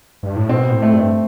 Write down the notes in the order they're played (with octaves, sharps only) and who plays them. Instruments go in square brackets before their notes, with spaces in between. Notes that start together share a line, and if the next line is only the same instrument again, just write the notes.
[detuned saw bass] G2
A2
[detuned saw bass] B2 [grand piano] C4
[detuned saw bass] A2
[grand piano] A3
[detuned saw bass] G2 [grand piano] A3